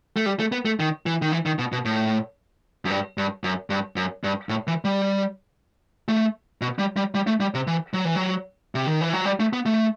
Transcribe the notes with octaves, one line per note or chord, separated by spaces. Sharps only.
A3
G3
A3
B3
A3
D#3
E3
D#3
E3
D#3
B2
B2
A2
F#2
G2
G2
F#2
G2
F#2
G2
A2
E3
G3
A3
B2
G3
G3
G3
A3
G3
C3
E3
F#3
E3
F#3
C3
D#3
E3
F#3
G3
A3
B3
A3